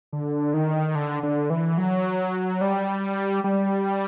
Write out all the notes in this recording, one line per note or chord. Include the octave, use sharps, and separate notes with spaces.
D3
D#3
D3
D3
E3
F#3
G3
G3